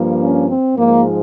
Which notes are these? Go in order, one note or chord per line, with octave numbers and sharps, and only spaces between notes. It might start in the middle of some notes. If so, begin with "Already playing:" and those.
Already playing: G2 F3 A#3
C#4
C4
G#2 F3 G#3 A#3